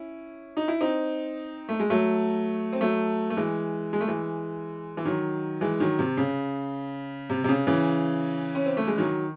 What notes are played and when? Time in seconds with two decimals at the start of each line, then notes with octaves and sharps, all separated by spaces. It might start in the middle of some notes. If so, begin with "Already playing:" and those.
Already playing: C#4 E4
0.57 D#4
0.68 E4
0.81 C4 D#4
1.69 A3
1.80 G#3
1.90 F#3 A3
2.73 C4
2.81 F#3 A3
3.30 A3
3.37 E3 G#3
3.93 G#3
4.01 A3
4.08 E3 G#3
4.97 E3
5.05 D#3 F#3
5.61 E3 G#3
5.80 D#3 F#3
5.99 C3
6.17 C#3
7.30 C3
7.44 C3
7.49 C#3
7.67 C#3 E3
8.55 C#4
8.66 C4
8.77 A3
8.87 G#3
8.98 D#3 F#3